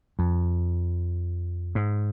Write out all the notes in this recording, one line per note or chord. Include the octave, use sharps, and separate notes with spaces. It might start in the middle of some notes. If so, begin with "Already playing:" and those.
F2
G#2